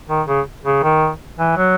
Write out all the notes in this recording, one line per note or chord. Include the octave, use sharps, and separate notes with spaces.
D#3
C#3
C#3
D#3
E3
F#3